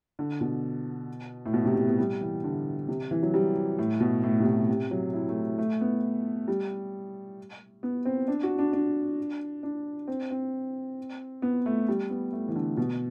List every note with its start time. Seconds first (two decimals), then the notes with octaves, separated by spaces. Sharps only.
0.19 D3
0.41 B2
1.46 A2
1.54 B2
1.65 C3
1.75 C3
1.87 B3
1.99 G3
2.21 E3
2.44 D3
2.89 C3
3.11 E3
3.23 F#3
3.34 G3
3.79 A2
4.00 B2
4.24 A2
4.40 C3
4.45 B2
4.69 C3
4.91 F#3
5.14 E4
5.29 A3
5.58 A3
5.81 B3
6.48 G3
7.83 B3
8.05 C4
8.28 D4
8.43 F#4
8.59 D4
8.73 D4
9.63 D4
10.08 C4
10.31 C4
11.42 B3
11.66 A3
11.88 G3
12.10 B3
12.33 A3
12.49 E3
12.56 D3
12.77 B2